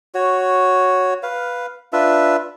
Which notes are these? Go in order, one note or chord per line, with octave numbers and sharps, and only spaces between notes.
F#4 C#5
B4 F5
D4 F4 B4 E5